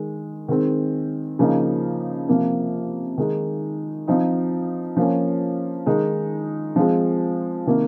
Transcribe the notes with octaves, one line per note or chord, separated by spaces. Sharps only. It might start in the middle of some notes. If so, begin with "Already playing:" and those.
Already playing: D#3 G#3
D#3 G#3 C4
C#3 F3 A#3 D#4
C3 F3 A#3
D#3 G#3 D#4
F3 C4 D#4
F3 A#3 C#4
D#3 G#3 D#4
F3 G#3 C4
C3 D#3 A#3